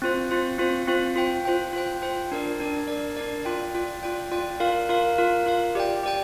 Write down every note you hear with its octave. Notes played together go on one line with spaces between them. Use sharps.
C4 F4 C5
C4 F4 C5
C4 F4 C5
C4 F4 C5
F4 C5 G5
F4 C5 G5
F4 C5 G5
F4 C5 G5
D4 A#4 D5
D4 A#4 D5
D4 A#4 D5
D4 A#4 D5
F4 D5 G5
F4 D5 G5
F4 D5 G5
F4 D5 G5
F4 A#4 F5
F4 A#4 F5
F4 A#4 F5
F4 A#4 F5
G4 D5 G5
G4 D5 G5